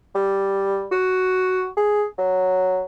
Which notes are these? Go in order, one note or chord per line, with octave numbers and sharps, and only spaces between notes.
G3
F#4
G#4
F#3